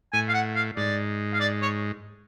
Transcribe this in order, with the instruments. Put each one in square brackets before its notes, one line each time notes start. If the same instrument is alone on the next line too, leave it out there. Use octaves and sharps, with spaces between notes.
[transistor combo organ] A2 [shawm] G#5
[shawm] F5
F#5
F5
[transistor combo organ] G#2 [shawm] D5
[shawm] F5
D5
C#5